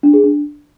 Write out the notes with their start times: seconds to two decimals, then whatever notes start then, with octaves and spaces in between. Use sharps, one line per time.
0.03 D4
0.14 G#4
0.24 D4